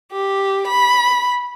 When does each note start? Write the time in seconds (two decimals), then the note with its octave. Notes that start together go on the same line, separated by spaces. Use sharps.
0.12 G4
0.67 B5